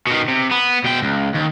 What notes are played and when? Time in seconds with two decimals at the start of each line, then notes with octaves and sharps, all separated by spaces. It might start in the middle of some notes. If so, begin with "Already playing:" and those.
0.07 B2 D#3
0.28 C3
0.51 B3
0.84 B2 G5
1.02 C#2
1.34 D#2